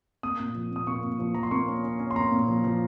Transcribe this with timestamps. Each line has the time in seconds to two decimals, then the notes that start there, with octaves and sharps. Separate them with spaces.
0.23 A#3 D#6
0.40 A#2
0.55 F3
0.72 A#2 D#6
0.87 A#3 C#6
1.04 A#2
1.19 F3
1.35 F3 A#5
1.43 C6
1.51 A#3 C#6
1.67 C#4
1.83 C#4
2.00 C#4
2.11 C6
2.16 A#3 A#5
2.32 A#2
2.48 F3
2.64 F3